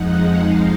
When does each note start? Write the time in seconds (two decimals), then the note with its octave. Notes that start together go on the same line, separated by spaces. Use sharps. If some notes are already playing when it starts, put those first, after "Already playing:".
Already playing: F2 F3 G#3 D#4 F#5
0.42 F5